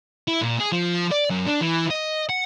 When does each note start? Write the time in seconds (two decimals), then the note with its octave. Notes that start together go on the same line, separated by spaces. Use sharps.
0.28 E4
0.41 A#2
0.60 G#4
0.72 F3
1.11 D5
1.30 F#2
1.47 D4
1.61 E3
1.90 D#5
2.29 F#5